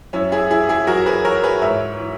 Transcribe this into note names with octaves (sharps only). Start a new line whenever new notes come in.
F#2 C#4 E4
E4 G#4
E3 E4 G#4
E4 G#4
F#2 F#4 A#4
G#4 B4
E3 A#4 C#5
G#4 B4
G#2 C#5 E5
E3